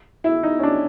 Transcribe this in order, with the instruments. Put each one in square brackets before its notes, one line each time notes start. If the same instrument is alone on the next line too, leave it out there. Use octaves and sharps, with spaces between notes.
[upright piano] E4
D#4
C#4
D4